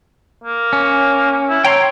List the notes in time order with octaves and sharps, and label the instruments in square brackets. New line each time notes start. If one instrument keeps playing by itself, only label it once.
[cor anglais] A#3
[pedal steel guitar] C#4
[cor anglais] E4
[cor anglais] C#5 [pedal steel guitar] G5 A#5 C6